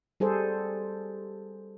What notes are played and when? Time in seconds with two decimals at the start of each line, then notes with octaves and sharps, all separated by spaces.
0.20 G3 G#4 A4 C5